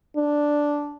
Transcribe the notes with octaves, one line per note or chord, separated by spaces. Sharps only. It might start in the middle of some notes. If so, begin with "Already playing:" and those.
D4